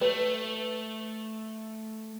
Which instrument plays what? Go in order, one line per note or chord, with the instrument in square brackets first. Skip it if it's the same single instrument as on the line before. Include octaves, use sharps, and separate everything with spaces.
[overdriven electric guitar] A3 [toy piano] B4 C#5